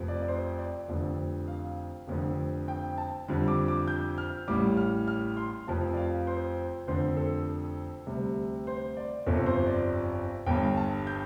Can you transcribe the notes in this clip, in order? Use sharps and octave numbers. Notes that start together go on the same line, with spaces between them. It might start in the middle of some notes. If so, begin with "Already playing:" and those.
Already playing: F1 F2 F3
D5
D5
C5
D5
F1 F2 D3
F5
F1 F2 D3 F3
G5
A5
F2 D3 G3
D6
D6
G6
F6
A1 A2 G3 D6
F6
F6
C6
F1 F2 F3 A5
D5
F5
C5
F1 F2 D3 C5
A4
D2 C3 G3
C5
D5
G1 F2 C3 F3 A4
C5
D5
G1 G2 G3 G5
A5
G6